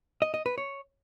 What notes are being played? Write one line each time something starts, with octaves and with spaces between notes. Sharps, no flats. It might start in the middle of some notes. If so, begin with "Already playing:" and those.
D#5
D#5
B4
C#5